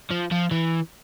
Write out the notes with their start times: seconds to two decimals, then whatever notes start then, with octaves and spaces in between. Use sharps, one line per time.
0.10 F3
0.31 F3
0.51 E3